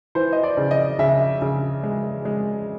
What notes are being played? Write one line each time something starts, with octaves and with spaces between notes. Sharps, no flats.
E3 C5
D#5
D5
C#3
D#5
C#3 E5
C#3
G#3
G#3